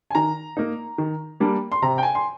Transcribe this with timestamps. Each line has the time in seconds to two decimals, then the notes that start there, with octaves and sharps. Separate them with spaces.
0.11 G#5
0.15 D#3 A#5
0.57 A#3 D#4
0.98 D#3
1.40 G3 A#3 D4
1.72 C6
1.82 C3 A#5
1.98 G5
2.03 G#5
2.15 C6